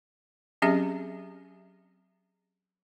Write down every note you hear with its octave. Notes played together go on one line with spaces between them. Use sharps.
F#3 C4 C#4 G4 G#4 E5